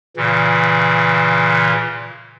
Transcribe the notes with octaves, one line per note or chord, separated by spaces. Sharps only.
A#2 C#3 E3